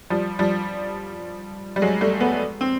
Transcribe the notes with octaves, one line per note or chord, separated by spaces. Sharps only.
F3 G3
F3 G3
G3
F#3 G#3
G3 A3
A3 B3
C4